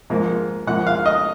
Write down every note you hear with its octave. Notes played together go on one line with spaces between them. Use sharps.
G#2 F3 A#3
G#2 F3 A#3 F#5
F5
D#5